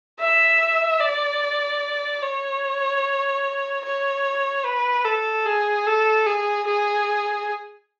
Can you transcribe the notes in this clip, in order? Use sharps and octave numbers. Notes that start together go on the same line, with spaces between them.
E5
D5
C#5
C#5
B4
A4
G#4
A4
G#4
G#4